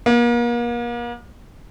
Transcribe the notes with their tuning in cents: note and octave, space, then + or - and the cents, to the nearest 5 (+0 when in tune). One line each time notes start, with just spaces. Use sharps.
A#3 +40